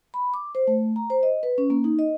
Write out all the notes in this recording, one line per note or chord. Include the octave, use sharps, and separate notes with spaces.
B5
D6
C5
A3
A#5
C5
D#5
B4
C#4
A#3
D#4
D#5